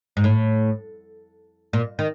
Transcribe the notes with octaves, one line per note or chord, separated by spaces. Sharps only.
G#2
A2
A#2
D#3